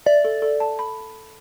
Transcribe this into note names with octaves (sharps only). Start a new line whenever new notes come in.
D5 E5
A4
A4
A5
B5